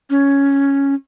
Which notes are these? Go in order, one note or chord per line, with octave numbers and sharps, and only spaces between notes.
C#4